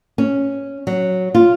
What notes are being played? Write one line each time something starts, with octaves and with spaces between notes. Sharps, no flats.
C#4
F#3
F4